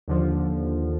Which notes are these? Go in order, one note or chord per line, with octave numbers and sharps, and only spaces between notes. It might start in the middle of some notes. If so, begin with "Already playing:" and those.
D#2 D3 F3